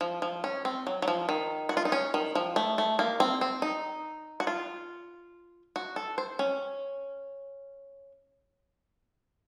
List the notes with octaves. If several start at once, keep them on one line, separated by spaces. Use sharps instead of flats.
F3
F3
C#4
C4
F#3
F#3
F3
D#3
F#4
F4
D#4
C#4
D#3
F3
A3
A3
A#3
C4
C4
D#4
F#4
F4
F#4
A4
C5
C#4